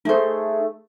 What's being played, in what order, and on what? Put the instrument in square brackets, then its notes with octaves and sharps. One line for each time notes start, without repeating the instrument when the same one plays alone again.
[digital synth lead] A3 [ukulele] D#4 C5 [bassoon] G#4